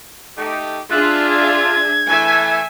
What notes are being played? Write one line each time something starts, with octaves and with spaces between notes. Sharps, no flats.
A3 D#4 G4
D4 F4 G#4 E5 F#6
G#6
E3 A3 E5 G#5